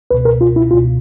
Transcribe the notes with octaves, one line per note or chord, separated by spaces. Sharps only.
C#2 B2 B4
A#4
F4
E4
C#2 B2 F4